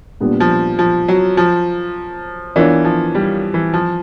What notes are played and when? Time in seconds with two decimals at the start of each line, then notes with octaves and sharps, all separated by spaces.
0.20 A#2 G3 B3 D4
0.40 F3
0.79 F3
1.08 F#3
1.37 F3
2.56 E3 B3 D4 F4 A#4 C#5
2.85 F3
3.15 G3
3.54 E3
3.73 F3